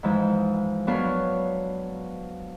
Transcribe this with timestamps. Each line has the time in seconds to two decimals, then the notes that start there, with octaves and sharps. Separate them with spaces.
0.03 G#2 E3 F3 G#3
0.87 F#3 B3 D4 B4 C#5 F5